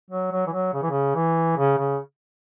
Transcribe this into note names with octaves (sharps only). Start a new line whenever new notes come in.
F#3
F#3
E3
F#3
C#3
E3
C#3
E3
C#3
C#3